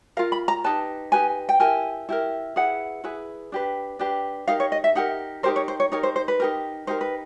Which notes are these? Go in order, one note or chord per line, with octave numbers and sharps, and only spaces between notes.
F4 A#4 F5
B5
A#5
D#4 G4 B4 A5
D#4 G4 B4 G#5
G5
E4 G4 A#4 G#5
E4 G4 A#4
E4 G#4 B4 F#5
E4 G#4 B4
D4 G4 B4
D4 G4 B4
D#4 G4 A#4 F5
C#5
D#5
E5
D#4 G4 A#4 F#5
D#4 G4 A#4 C5
C#5
C5
C#5
D#4 G4 A#4 C#5
C5
C5
B4
D#4 G4 A#4
D#4 G4 A#4 C5
B4